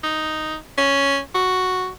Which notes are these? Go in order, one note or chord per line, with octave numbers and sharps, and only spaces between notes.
D#4
C#4
F#4